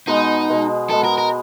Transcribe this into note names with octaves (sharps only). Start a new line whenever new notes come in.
B2 G#3 B3 D#4
B2 G#3 B3
B2 G#3 B3 A4
A#4
A#4